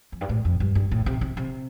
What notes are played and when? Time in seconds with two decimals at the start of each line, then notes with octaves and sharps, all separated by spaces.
0.12 F2
0.21 G2
0.29 A2
0.45 F2
0.60 G2
0.75 G2
0.91 A2
1.06 C3
1.21 C3
1.37 C3